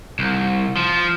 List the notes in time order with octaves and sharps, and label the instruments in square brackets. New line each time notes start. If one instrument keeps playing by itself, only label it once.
[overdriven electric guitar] C2
F3